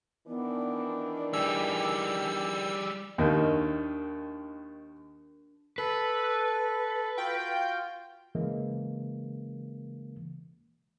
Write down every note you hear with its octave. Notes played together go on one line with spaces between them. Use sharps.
D#3 E3 B3 D4
G3 G#4 G5 E6
D#2 D#3 D4 A#4 E5
A4 B4
F4 F#4 F5 G5
C#3 E3 G#3 A#3